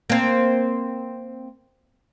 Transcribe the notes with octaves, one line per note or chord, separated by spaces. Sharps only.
A#3 C4